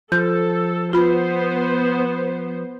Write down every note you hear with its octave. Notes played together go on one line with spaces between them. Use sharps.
F3 A4 G6
B3 F4 C5 B5